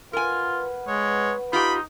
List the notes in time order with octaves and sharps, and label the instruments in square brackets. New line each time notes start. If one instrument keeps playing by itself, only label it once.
[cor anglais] F4 [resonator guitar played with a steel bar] A#4 G#5 [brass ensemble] B4 F#5
[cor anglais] G#3 [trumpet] C#5
[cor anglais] D#4 [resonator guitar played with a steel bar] F4 G4 [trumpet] B5